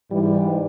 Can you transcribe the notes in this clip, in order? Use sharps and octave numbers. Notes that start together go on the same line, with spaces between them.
G#2 E3 G3